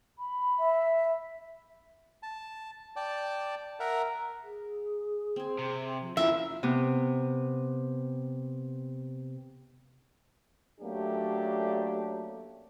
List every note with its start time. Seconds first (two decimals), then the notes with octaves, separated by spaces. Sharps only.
0.18 B5
0.59 E5
2.23 A5
2.96 D5 G5 A5
3.80 A#4 E5 F#5 A#5
4.43 G#4
5.36 C4 G#5
5.58 C3
6.01 F3
6.17 E2 E3 C#4 F4 A#4 E5
6.63 C3 B3
10.81 F#3 A3 A#3 C#4 D4 G4